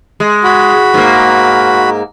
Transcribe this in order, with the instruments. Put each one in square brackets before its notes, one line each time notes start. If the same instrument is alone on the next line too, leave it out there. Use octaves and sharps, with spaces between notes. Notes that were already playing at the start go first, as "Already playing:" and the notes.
[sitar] G#3
[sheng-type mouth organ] F#4 B5
[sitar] G#2 A#3